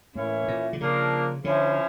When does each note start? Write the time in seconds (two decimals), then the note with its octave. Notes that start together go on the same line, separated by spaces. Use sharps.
0.15 A2 E3 A#3 C#4 E4
0.48 A#2
0.73 D3
0.80 C#3 F3 A#3 D4
1.44 D3 F3 C#4 E4